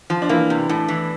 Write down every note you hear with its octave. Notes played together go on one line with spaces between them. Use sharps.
F3
D4
E3 A#3 E4
C3
A2
E3